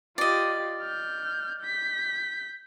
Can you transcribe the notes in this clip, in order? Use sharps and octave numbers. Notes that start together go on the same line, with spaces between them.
F4 G4 D5 D#5
F6 G6
G6 B6